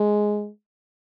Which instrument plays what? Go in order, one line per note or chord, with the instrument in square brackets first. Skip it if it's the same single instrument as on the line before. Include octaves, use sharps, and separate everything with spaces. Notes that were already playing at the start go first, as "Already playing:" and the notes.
Already playing: [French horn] G#3